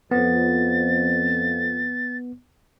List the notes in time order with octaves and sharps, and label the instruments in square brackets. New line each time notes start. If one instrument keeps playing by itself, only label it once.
[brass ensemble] F2 [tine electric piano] B3 [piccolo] A6